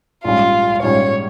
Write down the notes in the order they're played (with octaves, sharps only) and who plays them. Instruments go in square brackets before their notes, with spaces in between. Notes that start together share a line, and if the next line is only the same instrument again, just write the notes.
[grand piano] A#1 G#2 G3 C#4 [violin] F4
[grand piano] A#1 G#2 G3 C#4 [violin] C#5